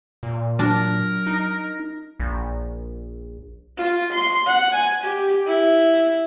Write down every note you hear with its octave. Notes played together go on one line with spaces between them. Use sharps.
A#2
F#3 D4 A#4
D#4
A#1
F4
C6
F#5
G#5
G4
E4